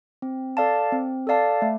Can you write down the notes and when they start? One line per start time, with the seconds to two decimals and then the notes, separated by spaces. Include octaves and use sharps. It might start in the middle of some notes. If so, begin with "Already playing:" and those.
0.22 C4
0.57 A4 D5 F5 A5
0.92 C4
1.27 A4 D5 F5 A5
1.62 A3